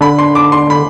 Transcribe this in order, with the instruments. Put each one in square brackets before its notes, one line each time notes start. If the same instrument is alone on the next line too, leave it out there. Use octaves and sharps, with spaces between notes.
[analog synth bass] D3 [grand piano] B5
[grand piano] C6
D6
C6
B5